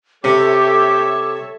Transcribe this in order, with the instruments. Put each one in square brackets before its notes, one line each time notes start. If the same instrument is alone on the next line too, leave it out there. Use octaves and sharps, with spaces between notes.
[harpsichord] C3 [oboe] G4 [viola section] A4 C#5 E5 [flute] D6